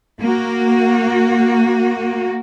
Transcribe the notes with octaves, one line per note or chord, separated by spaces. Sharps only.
A#3 F#4